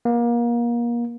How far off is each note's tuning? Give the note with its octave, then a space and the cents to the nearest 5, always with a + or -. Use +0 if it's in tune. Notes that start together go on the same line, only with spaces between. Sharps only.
A#3 +30